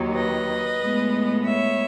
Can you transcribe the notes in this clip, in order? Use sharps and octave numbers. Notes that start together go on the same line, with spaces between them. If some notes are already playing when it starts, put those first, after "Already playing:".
Already playing: D#2 D#3 F#3
B4 D#5
A2 G#3 B3
C#5 E5